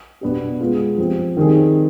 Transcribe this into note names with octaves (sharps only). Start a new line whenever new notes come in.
B2 B3 D4 G4
G#3 B3 F4 G#4
F3 C4 G4
D#3 G3 C4 D#4 G#4